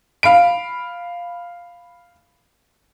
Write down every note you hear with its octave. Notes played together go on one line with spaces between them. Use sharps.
F5 B5 D7